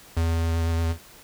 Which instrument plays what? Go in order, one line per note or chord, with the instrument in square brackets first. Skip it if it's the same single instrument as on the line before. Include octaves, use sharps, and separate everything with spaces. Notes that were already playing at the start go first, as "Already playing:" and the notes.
[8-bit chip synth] E2